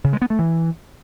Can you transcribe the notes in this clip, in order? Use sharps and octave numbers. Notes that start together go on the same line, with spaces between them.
C#3
G#3
B3
A3
E3